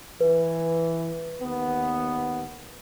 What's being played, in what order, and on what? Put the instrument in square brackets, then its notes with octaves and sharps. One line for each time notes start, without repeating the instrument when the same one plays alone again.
[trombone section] E3 [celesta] B4
[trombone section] D#2 B3